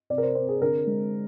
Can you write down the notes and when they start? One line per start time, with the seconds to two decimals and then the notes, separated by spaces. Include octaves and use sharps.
0.10 C3 D5
0.18 A#4
0.23 C5
0.35 C4 C5
0.48 G#4
0.61 D3 A#4
0.87 G#3